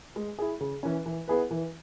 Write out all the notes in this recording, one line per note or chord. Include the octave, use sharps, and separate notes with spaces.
G#3
E4 G#4
C#3
E3 C#4
E3
B3 E4 G#4 B4
E3